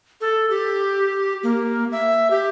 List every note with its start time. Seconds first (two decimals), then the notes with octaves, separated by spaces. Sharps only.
0.21 A4
0.50 G4
1.43 A#3
1.92 E5
2.30 G4